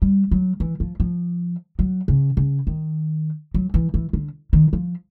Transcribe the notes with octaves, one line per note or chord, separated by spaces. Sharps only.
G3
F#3
E3
F3
F3
F#3
C#3
C#3
D#3
F#3
E3
E3
D3
D#3
F3